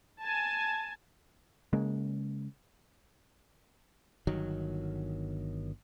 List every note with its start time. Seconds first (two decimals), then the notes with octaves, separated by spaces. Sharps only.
0.22 G#5 A5
1.73 C#3 G#3 A#3
4.27 G1 D#3 F#3